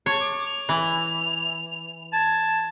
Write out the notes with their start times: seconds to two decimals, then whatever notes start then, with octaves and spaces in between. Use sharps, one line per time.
0.06 C#5 A5
0.20 D6
0.46 F7
0.69 E3
2.13 A5 G#6